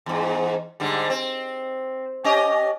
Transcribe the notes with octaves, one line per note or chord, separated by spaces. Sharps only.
E2 G#2
G#2 D3 G3
C4
C#4 G4 D#5